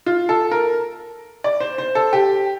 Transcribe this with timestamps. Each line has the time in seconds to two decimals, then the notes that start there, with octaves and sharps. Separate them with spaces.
0.06 F4
0.29 A4
0.51 A#4
1.44 D5
1.60 C5
1.78 C5
1.95 A4
2.13 G4